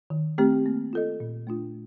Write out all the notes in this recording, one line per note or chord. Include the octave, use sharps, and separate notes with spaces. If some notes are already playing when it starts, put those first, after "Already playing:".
D#3
A3 C4 G4
A#3
F4 A4 D#5
A#2
A3 D4 F4